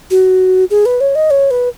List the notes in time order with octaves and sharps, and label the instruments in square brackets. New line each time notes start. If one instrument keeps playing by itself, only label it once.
[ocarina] F#4
G#4
B4
C#5
D#5
C#5
B4